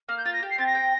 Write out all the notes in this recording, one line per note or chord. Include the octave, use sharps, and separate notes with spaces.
A#3 F6
G6
F4 A6
A#6
G4
C7
C4 A6
A#6
G5